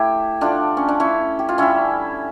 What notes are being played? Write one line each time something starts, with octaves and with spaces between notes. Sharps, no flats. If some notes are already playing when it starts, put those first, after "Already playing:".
Already playing: A3 E4 G4
D3 A3 D4 F4
C#4
D4
C#4 E4
G4
F4
D3 G3 C#4 E4